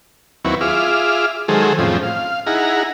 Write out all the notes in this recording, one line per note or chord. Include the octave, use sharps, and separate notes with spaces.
D#2 F#3 C4 E4 B4 C#6
F4 G#4 E5 D6 F6
D#3 F#3 G#3 G#4 A4 C5
F2 A2 F3 C4 C#4
F5
D#4 E4 G#4 F#5 A#5